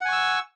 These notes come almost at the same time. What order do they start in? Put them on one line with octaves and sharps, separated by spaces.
F#5 G#5 C#6 E6